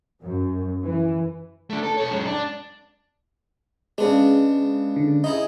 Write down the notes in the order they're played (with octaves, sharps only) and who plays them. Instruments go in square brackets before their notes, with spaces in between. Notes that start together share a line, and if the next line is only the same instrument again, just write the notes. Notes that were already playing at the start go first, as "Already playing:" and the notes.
[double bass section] F#2
E3
[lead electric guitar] A3 D4
A4
B2 C#5
F#2 G#3
D4
[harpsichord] C#3 B3 D4 [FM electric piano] G#3
[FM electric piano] D3
[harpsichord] D#4 E4 G#4 [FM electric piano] D#5